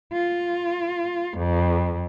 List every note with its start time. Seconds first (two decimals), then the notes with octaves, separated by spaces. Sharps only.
0.12 F4
1.37 F2